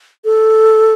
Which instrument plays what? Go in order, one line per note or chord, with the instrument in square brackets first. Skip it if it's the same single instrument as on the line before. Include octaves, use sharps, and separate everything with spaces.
[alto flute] A4